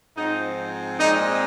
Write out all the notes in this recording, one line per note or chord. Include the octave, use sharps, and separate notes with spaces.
G#2 F3 C4 D#4
A#2 G#3 C4 D#4